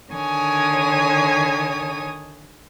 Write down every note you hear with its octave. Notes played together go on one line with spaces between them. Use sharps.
D3 D#3 C#5 G#5 D#6